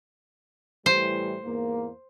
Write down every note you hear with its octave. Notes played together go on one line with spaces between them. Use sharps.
A2 E3 G3 C5
E2 G#2 A#3